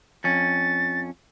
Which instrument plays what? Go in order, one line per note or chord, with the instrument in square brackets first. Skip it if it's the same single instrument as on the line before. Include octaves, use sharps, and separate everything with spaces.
[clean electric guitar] F2 C#4 [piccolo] A6